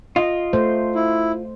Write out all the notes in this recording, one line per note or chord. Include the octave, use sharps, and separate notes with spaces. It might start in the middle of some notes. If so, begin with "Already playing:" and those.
F4 D#5
A3 C5
E4